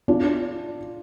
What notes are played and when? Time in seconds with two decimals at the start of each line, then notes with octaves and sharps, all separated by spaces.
0.08 D4 F4